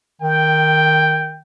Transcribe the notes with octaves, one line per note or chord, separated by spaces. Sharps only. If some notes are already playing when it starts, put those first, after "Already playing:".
D#3 G5